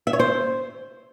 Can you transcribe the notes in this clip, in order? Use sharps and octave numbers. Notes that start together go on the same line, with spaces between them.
E5
C#5
C5